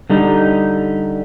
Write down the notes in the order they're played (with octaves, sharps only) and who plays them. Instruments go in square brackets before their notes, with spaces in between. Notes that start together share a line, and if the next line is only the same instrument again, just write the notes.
[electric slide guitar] D3 G3 D#4